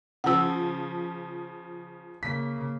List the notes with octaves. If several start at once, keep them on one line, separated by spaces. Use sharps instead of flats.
C#3 F3 F#5 E6
C#3 A#3 B6